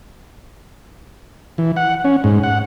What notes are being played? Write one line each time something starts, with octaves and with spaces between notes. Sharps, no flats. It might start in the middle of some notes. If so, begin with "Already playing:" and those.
E3
F#5
C#4
G#2
F#5